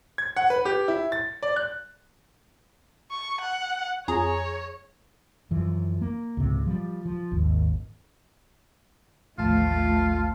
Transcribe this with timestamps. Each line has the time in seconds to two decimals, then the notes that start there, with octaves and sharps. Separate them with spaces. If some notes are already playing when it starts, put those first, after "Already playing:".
0.18 G#6
0.36 F#5
0.50 B4
0.65 G4
0.88 E4
1.12 A6
1.43 D5
1.56 F#6
3.11 C#6
3.41 F#5
4.08 F2 G#4 C#5 A#5
5.51 F#2 E3 F3
6.01 A#3
6.37 C#2 G#2 C3
6.67 F3 G3
7.06 F3
7.31 G#1 D#2
9.38 A1 D#2 F3 A3 F4 A5